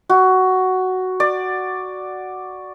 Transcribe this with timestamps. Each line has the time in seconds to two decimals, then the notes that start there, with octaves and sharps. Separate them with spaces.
0.09 F#4
1.20 D5